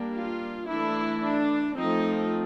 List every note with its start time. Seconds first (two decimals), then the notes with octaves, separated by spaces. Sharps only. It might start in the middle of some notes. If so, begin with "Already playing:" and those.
Already playing: G3 A#3 D4
0.13 F4
0.67 E3 A3 D4 E4
1.22 D4
1.77 F3 A3 C4 D#4